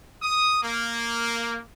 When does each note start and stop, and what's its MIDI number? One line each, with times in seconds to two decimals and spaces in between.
0.22 0.61 87
0.63 1.59 58